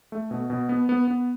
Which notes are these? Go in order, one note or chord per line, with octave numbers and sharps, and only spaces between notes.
A3
B2
B2
B3
B3
B3